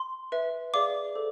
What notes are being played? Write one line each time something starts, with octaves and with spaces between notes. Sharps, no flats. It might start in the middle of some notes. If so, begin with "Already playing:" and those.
Already playing: C6
B4 E5
G#4 D5 F5 D6
A4 C5